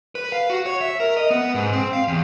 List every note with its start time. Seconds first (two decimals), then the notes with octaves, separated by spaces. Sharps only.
0.15 B4
0.32 F5
0.50 F#4
0.66 C#5
0.81 E5
1.00 A#4
1.17 D#5
1.30 B3
1.55 G#2
1.73 C4
1.93 F5
2.08 E2